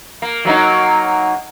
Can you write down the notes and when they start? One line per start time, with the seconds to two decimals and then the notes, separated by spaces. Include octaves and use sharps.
0.22 A#3
0.45 F#3 A#3 D#4